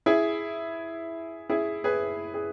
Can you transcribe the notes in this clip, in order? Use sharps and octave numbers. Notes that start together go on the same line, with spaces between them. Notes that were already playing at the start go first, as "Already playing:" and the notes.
E4 G#4
E4 G#4
G#4 B4
G#4